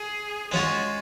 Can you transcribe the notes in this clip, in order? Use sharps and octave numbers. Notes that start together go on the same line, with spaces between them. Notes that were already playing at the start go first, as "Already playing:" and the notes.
Already playing: G#4
G#3 C#4 F4 F#4